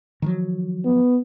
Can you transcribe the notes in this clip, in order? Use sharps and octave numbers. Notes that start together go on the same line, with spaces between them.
D#3 F3 F#3
B3